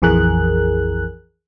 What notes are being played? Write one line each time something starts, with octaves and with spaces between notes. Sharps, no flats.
A#1 F2 E3 G#4 A#4 F#6